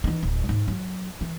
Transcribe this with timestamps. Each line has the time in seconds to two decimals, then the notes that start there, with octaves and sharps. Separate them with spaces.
0.04 E3 D#4
0.23 D1
0.49 G#2
0.68 F#3
1.21 E3